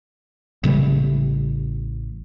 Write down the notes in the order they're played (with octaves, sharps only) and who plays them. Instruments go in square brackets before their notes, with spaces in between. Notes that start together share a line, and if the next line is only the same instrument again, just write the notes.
[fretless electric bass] A1 C#3 G3 A3